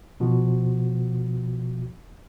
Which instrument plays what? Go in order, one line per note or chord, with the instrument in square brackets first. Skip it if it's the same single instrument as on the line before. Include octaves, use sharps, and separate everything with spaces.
[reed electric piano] B2 F3 F#4